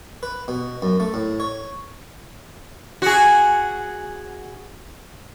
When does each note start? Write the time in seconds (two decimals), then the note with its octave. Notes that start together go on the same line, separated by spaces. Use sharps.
0.23 B4
0.48 B2
0.82 F#2
1.00 A3
1.14 A2
1.40 C#5
3.02 F#4 G#4